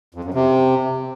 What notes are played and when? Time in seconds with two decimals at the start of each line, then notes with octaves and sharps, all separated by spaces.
0.15 F2
0.24 F#2
0.34 C3